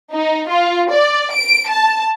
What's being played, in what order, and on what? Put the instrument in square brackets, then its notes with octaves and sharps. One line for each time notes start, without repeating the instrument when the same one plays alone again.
[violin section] D#4
F4
D5
D7
A5